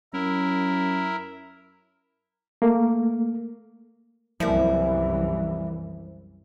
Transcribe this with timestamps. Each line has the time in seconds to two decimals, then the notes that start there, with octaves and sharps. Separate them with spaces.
0.13 F#2 E4 A#4
2.62 A3 A#3
4.40 C2 F#2 E3 F3 G3 A#3 E4